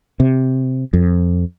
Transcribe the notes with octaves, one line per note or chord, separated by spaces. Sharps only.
C3
F2